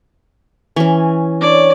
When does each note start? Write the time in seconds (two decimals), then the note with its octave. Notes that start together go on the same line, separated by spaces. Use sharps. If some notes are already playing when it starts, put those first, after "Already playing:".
0.76 E3 C#4
1.41 D4 C#5 D5 C#6